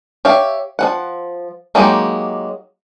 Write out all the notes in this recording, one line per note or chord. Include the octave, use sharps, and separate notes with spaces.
G4 C#5 E5 F5
F3 C#4 F#5
F#3 G#3 A#3 D#4 G4